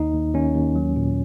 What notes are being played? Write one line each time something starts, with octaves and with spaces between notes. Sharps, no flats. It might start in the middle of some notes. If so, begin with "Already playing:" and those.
Already playing: D#2 D#4
D#2
D#2 C#4
D#2
F#3
A#2